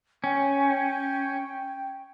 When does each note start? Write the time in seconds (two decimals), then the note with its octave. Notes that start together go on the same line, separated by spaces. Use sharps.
0.24 C#4 G5